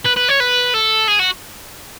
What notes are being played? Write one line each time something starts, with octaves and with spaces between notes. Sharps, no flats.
B4
B4
C#5
B4
A4
G#4
F#4